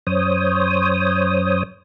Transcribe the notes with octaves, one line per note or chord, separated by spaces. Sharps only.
F#2 C5 C#5 D#6